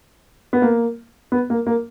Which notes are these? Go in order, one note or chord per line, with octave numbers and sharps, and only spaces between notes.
B3
A#3
B3
A#3
A#3